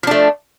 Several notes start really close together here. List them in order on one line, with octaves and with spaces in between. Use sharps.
F3 D4 A3